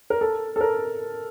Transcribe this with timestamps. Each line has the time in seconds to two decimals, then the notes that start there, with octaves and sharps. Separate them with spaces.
0.10 A#4
0.21 A4
0.56 A4
0.61 A#4